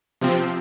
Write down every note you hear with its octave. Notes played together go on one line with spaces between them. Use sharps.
C3 F3 C4